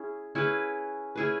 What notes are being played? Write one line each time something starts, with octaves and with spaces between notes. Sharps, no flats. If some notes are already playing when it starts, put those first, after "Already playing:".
Already playing: C#4 E4 G#4
C#4 E4 G#4 B4
C#4 E4 G#4 B4